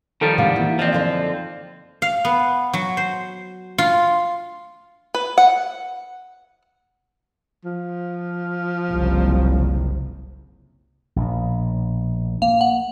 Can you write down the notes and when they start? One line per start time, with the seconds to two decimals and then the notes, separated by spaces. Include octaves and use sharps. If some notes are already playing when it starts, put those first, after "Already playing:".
0.21 D#3 F3 G3 A4 C5
0.38 A2 C3 G#3 D4 G4 F5 F#5
0.56 E3 A#3 E4
0.79 F3 C4 D4 D#4 D#5
0.93 F#2 D3 D#4 F5
2.02 F5
2.25 B3
2.73 F#3
2.97 C5
3.78 F4
5.15 B4
5.38 F#5
7.65 F3
8.91 F#1 C2
11.16 A#1 B2
12.42 A#3 F5
12.61 F#5